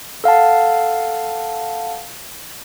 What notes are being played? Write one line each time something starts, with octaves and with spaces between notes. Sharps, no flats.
A4 F5 F#5 A5